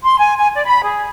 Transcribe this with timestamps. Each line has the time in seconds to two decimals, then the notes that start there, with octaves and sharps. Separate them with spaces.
0.04 C6
0.19 G#5
0.37 G#5
0.54 D5
0.65 B5
0.83 G#4